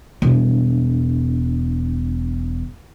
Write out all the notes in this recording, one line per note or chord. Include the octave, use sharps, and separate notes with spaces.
E1 G2